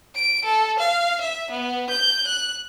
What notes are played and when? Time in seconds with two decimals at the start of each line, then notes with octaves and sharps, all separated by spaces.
0.15 D7
0.45 A4
0.79 F5
1.21 E5
1.51 B3
1.90 G6
2.27 F#6